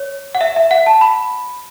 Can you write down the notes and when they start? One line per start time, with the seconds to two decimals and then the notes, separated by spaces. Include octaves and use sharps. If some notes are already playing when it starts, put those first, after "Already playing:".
Already playing: C#5
0.35 F#5
0.41 E5
0.56 E5
0.71 F#5
0.86 A5
1.01 B5